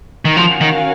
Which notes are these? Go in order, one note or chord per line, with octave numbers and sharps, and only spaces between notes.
D#3
F3 C#4 F#4 A#4 F5 G#5
D#3